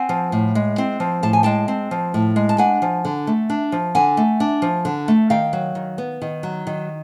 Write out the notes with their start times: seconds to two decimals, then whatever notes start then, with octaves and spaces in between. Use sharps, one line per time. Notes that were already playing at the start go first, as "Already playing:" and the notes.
Already playing: C4 F#5 G#5
0.09 F3
0.32 A2
0.55 G#3
0.78 C4
1.00 F3
1.23 A2 A5
1.33 G#5
1.43 G#3 G5 A5
1.68 C4
1.91 F3
2.14 A2
2.36 G#3
2.49 A5
2.58 D4 F#5 G#5
2.82 F3
3.05 D3
3.27 A3
3.50 D4
3.72 F3
3.95 D3 F#5 G#5
4.17 A3
4.40 D4
4.62 F3
4.85 D3
5.08 A3
5.30 D#3 F5 G5
5.53 F#3
5.75 D#3
5.98 B3
6.22 D#3
6.43 F#3
6.67 D#3